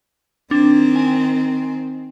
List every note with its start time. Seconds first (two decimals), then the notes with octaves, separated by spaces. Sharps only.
0.51 D#3 C4 D4
0.96 G#5 C6